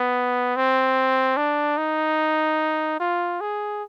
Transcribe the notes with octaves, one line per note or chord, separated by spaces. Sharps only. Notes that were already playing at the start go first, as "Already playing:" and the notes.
Already playing: B3
C4
D4
D#4
F4
G#4